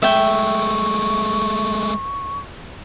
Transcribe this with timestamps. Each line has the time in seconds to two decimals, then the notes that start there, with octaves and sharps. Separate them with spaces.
0.02 G#3 A3 E5 G5 C#6